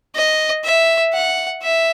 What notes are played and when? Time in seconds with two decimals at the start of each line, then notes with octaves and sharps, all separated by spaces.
0.15 D#5
0.65 E5
1.13 F#5
1.63 E5